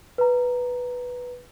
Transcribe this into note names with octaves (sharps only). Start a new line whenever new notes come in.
B4 A#5